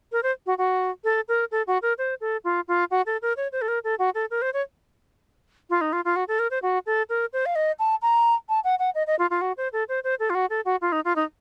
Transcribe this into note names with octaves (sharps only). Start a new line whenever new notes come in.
A#4
C5
F#4
F#4
A4
A#4
A4
F#4
A#4
C5
A4
F4
F4
F#4
A4
A#4
C#5
C5
A4
A#4
A4
F#4
A4
A#4
C5
C#5
F4
D#4
F4
F4
F#4
A4
A#4
C5
F#4
A4
A#4
C5
F5
D#5
A5
A#5
A5
F#5
F#5
D#5
D#5
F4
F4
F#4
C5
A4
C5
C5
A4
F4
F#4
A4
F#4
F4
D#4
F4
D#4